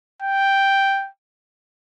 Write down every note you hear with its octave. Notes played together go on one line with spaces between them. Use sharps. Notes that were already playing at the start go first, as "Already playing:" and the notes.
G5